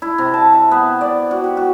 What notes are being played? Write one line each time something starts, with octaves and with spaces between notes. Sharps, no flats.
E4
C3
A5
E5
B3
D5
F#4
G4
F#4